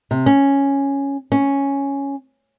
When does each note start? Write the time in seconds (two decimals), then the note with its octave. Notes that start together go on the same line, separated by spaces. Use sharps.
0.11 C3
0.26 C#4
1.32 C#4